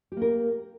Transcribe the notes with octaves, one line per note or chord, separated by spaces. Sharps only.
A#3 G4 A#4